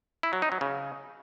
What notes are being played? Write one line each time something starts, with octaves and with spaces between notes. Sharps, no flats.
E4
F#3
D#4
F#3
C#3